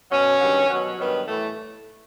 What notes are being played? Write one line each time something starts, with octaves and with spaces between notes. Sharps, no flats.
B2 F#3 C#4
G2 D#3 F#3
B2 F#3
G2 D#3 F#3 B3
A2 E3 A3